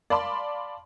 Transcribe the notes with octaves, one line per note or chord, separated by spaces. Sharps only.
D5 F5 A5 B5 C6 D6